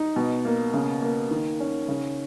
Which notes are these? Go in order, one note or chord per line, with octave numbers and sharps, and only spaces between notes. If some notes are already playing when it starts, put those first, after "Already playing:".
Already playing: D#4
B2
A#3
C#3
A#3
D#3
C#4
C#3